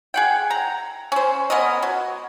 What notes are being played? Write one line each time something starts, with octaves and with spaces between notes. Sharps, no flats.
G#4 F#5 G5
A#5
C#4 C5
B3 C#4 A#4 D#5
F#3